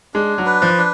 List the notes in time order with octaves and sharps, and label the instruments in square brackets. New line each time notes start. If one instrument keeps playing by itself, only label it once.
[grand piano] G#3 [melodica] D4
[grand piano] F#3
[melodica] B4
[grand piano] F3
[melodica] D4